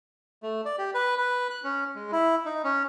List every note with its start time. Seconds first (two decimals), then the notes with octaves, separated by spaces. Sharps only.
0.43 A3
0.65 D5
0.78 G4
0.94 B4
1.18 B4
1.50 F#6
1.64 C#4
1.95 G#3
2.12 E4
2.45 D#4
2.64 C#4